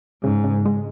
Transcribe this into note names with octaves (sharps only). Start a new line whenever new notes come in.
G#2 C#3
C#3
G#3